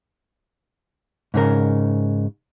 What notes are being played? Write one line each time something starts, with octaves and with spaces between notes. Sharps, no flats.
G#2 C#3 A#4